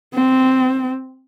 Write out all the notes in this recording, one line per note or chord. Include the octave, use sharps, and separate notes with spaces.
C4